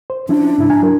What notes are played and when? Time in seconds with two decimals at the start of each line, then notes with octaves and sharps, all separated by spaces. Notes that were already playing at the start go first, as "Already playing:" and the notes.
0.10 C5
0.29 F3 C#4 D4 E4
0.58 G#2 C#3 E4
0.70 G#5 A#5
0.82 F#3 A#4